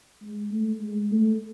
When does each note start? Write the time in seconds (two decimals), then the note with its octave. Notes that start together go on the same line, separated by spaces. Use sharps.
0.22 G#3
0.51 A3
0.81 G#3
1.11 A3